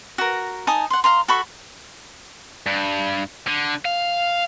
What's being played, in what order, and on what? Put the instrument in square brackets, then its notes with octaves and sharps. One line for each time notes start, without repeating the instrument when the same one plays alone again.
[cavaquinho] F#4 A#4
D#4 G#5 A5 D#6
F#5 C6
F5 A#5 C6
F#4 A4 B5 C#6
[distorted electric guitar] G2
D3
F5